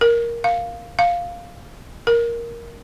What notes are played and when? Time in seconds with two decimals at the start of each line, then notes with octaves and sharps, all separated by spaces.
0.01 A#4
0.44 F5
0.99 F5
2.07 A#4